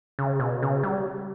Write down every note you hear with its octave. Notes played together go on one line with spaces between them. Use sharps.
C#3
B2
C#3
G3